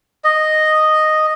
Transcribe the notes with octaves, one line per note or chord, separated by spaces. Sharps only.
D#5